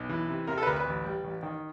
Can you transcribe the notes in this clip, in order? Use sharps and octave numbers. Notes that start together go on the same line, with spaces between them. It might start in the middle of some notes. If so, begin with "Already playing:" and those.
Already playing: B1
E3
C3
C3 A#4
A4
B4
D2 A#4
B4
A1
G3
A1
D#3